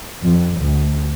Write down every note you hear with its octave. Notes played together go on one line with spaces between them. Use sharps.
F2
D2